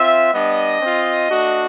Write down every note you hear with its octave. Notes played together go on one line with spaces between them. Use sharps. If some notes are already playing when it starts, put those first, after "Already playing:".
Already playing: C4 F4 E5
G3 B3 D4 D#5
C4 F4
A3 D4 F#4